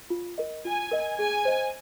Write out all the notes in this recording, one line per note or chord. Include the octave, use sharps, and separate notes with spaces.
F4
A#4 D#5
F4 G#5
A#4 D#5
G#4 G#5
C5 D#5